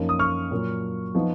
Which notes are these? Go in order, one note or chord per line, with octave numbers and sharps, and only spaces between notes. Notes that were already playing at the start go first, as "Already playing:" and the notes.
Already playing: F#2 F3 A#3 D#4
D#6
C#6 F6
A#2 F#3 A#3
F3 B3 D#4